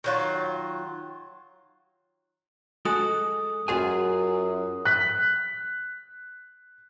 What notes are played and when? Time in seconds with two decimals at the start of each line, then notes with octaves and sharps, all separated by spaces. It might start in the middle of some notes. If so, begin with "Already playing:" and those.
0.04 D#3 F#3 F4
2.85 G#3 F#4 A4 D#6
3.68 F#2 F4 F#4 G#4 G#5
4.85 F#6 B6